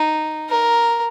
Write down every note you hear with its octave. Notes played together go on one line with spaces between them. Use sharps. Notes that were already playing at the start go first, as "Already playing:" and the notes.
Already playing: D#4
A#4